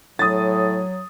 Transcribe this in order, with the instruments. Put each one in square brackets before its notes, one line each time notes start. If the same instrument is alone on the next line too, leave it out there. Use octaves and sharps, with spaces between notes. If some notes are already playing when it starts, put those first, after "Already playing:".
[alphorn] A2 [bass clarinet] F#3 [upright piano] D#6 A6